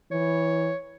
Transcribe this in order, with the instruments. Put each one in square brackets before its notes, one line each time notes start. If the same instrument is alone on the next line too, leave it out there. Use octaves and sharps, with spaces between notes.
[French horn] E3 [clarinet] C#5